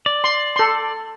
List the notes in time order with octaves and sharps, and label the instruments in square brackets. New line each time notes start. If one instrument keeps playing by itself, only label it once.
[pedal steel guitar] D5
[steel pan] C6
A4 C6